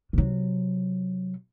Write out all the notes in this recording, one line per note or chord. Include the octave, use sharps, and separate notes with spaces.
C3 F#3